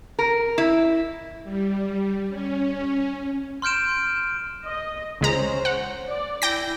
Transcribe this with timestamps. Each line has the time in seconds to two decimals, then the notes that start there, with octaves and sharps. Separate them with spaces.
0.19 A#4
0.58 E4
1.44 G3
2.29 C#4
3.62 C6 F6 G6 D7 E7
4.65 D#5
5.21 C#2 G#3 C#4 C5 A#5
5.65 F#5
6.07 D5
6.42 E4 G5 A#6